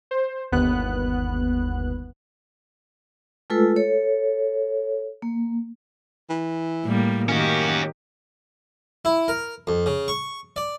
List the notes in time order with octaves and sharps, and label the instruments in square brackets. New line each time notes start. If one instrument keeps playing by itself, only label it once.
[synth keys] C5
G1 D#2 B3 F#6
[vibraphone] G#3 A3 F4 A4 B4 E6
A4 C#5
A#3
[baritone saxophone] E3
[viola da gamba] A2 G3 A#3
[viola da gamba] D#3 G4 [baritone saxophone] A#3 [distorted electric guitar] C#4 F#4
[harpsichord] E4
A#4
F2
C#3
C#6
D5